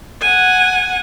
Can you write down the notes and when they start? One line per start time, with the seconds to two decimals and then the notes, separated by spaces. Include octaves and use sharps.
0.21 F#5 G#5